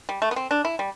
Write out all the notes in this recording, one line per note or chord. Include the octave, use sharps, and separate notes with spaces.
G3
A3
B3
C4
D4
E4
G3